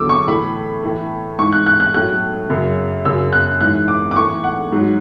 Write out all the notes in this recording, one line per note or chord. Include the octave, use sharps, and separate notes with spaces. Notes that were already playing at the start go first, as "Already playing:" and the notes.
Already playing: E2 D3 F#3 D6 E6
C#6
A2 E3 B5
A2 E3
G#2 E3 C#6
F#6
F#6
F#6
A2 F#3 F#6
F#2 C#3 F#3
F#2 C#3 F#3 E6
F#6
G#2 E3 F#6
D6
D6
A2 E3 C#6
F#5
G#2 F#3